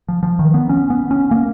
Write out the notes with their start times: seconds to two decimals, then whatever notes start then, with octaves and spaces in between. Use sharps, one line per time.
0.08 F3
0.23 F3
0.39 D#3
0.54 B3
0.69 C#4
0.90 B3
1.11 C#4
1.31 A#3